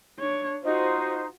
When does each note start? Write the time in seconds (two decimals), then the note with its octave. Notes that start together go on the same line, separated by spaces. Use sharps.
0.19 D4 C#5
0.63 D#4 F4 F#4 C5